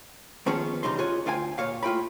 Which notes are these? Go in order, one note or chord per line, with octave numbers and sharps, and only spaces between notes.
D#3 F3 B3 C#4 G#4 C#5
E2 C#3 G3 D#4 C6
F4 F#4 G#4 C#5
D2 F4 F5 G5 G#5
A#2 C#5 F5
A2 F4 G5 B5